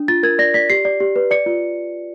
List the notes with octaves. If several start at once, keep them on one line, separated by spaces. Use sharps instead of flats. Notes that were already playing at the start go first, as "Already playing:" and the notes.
Already playing: D4
F4 A6
A#4 G#6
D5 A#6
D5 B6
G4 C7
D5
G4
B4
D5 C#7
F4